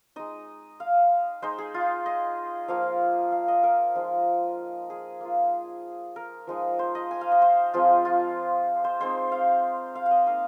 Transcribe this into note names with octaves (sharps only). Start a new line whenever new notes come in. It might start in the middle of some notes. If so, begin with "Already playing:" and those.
G#3 D#4 D#5
F5
G#3 D#4 C5
G#4
F4
D#5
F3 A#3 F4 F5
F5
D#5
A#4
F3 G#3 D#4
G#4
A#3 F4
A#4
F3 G#3 D#4
C5
D#5
G#5
F5
D#5
C5
F3 G#3 C4 F4
F4
C5
G#3 C4 D#4 C5
F5
F5
F5
D#5
A#3 D#4 F5